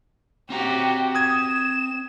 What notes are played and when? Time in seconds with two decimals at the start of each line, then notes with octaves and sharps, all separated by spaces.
0.50 C4 F#4 G4 A#5
1.15 D#6 G#6 E7